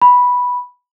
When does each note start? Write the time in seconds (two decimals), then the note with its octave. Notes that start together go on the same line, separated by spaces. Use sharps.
0.02 B5